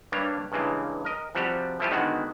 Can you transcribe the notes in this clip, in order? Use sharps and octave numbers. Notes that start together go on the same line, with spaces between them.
G2 G3 A#3 D4 C#5 A#5
G2 C#3 E3 G#3 A#3
A#4 D#5
C3 F3 G3 F#4 G4
F3 A3 E4 F4 G4
D3 D#3 G#3 B3 F#4